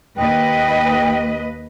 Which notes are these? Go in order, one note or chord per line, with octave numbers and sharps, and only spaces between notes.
D#2 B4 D#5 G5